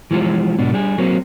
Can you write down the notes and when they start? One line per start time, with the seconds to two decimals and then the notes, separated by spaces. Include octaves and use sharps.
0.11 E3 F3 G#3 F4 G4
0.58 G#2 B2 D4
0.73 G3 D4 G#4
0.98 F#3 A#3 C4